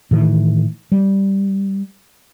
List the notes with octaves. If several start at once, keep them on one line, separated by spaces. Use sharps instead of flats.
A2 D#3 E3
G3